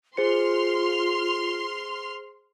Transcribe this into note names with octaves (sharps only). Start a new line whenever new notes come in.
F4 G#4 C5 C6 F6 C#7